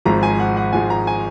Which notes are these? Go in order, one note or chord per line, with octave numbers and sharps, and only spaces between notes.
G#1 G#2 F3 G#3 A#5
G#5
F#5
F#5
G#1 G#2 F3 G#3 G#5
A#5
G#5